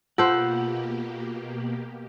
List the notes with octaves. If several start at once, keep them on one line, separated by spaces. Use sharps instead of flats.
B2 A#3 F4 G4 A4 C5 F#5